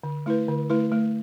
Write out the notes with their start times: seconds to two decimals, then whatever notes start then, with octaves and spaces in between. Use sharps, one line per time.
0.04 D3
0.26 A3 E4 B4
0.48 D3
0.70 A3 E4 B4
0.92 A3